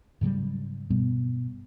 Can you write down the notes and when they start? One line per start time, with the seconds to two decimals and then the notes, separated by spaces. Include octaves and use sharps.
0.21 G#2 C#3 F#3 G3
0.90 G2 B2 G3 B3